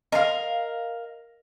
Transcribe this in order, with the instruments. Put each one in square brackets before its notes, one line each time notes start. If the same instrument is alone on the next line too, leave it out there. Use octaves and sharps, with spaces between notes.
[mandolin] A#4 F5 [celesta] D#5